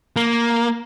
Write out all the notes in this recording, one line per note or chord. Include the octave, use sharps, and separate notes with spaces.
A#3